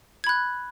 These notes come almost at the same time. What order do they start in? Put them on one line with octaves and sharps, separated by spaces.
G#6 B5 F#6